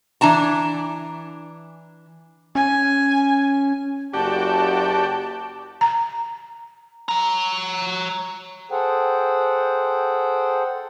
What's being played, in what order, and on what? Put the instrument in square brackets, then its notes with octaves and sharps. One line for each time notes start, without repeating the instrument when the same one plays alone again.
[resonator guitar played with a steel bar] E3 D4 A5 A#5
[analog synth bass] C#4 [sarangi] G#5
[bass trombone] F#1 [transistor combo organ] F#4 D5 G5 [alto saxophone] G4 [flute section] A5
[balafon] A#5
[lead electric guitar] C#5 A#5
[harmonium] G#4 A4 C5 F#5 G5